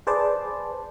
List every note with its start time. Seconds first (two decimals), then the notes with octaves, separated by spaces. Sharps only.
0.07 G#4 B4 C5 D5 A5